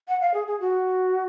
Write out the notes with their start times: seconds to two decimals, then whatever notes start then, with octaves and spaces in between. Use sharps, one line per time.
0.08 F#5
0.21 F5
0.34 G#4
0.47 G#4
0.60 F#4